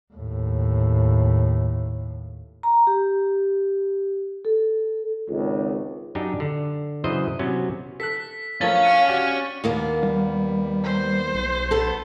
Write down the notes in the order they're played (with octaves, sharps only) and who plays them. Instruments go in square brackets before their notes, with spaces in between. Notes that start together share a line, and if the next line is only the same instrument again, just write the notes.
[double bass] D#2 A2
[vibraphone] A#5
G4
A4
[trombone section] G#1 C#2
[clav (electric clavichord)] F#2 D4 D#4 G4
D3
F#2 C#3 E3 C5 D#5
C3 F#3 B3 C#4
[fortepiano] A4 F#6 [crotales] B6
[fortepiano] F3 A3 A#4 [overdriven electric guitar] C#4 C#5 [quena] F5 [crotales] A6
[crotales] F6 C#7 D#7
[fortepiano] F#4 G4 D5
[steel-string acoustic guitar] D#2 A#3 B3
[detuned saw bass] G3
[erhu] C5
[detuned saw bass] B1
[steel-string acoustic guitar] B3 A4